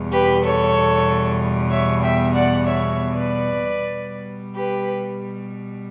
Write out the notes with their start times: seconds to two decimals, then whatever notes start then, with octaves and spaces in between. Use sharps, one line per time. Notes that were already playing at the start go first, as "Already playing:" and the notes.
Already playing: E2 B2 G3
0.12 G4 B4
0.44 A4 C#5
1.70 C#5 E5
2.02 E5 G5
2.33 D5 F#5
2.65 C#5 E5
3.13 B4 D5
3.61 B2 G3
4.55 G4 B4